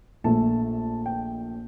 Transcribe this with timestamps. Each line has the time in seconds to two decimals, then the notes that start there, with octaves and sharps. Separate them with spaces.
0.24 A#1 A#2 A3 A5
1.06 G5